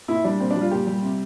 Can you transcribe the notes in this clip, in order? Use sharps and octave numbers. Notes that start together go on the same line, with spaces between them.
A#2 E4
G3 D4
A#2 C4
D4
G3
F4
A#2 G4
G3
C3